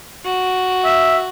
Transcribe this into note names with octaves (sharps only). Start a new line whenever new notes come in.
F#4
E5